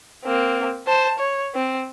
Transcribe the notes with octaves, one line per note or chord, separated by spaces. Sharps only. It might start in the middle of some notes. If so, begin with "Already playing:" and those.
A#3 C4
C5 A5
C#5
C4